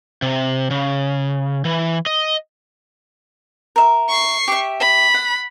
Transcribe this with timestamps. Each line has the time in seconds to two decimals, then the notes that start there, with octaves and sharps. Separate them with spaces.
0.22 C3
0.71 C#3
1.65 E3
2.06 D#5
3.76 A#4 E5
4.09 C#6 C7
4.48 G4 E5
4.80 B5
5.14 F#5